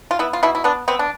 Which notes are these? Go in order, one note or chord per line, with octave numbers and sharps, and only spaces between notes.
F4
B3 E4
F4
B2 E4
E4
B3 D4
B3 C4
D4